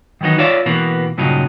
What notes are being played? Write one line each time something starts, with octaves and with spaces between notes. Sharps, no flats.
D#3 E3 F#3 B3 D#4
F4 C#5 D5 E5 F5
B2 E3 A#3 B3
G2 A#2 C#3 F#3 D#4